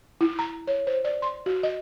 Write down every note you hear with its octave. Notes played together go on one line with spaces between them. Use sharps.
E4
A#5
C#5
C5
D5
C6
F#4
D#5